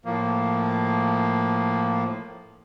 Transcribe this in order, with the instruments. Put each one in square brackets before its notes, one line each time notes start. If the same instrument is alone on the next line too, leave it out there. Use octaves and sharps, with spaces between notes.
[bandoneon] A2 F3 A#3